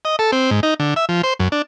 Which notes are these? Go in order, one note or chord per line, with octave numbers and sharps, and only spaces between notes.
D#5
A4
C4
G#2
D#4
D3
E5
F3
C5
F#2
D4